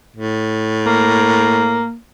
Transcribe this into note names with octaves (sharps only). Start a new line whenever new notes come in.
A2
A#3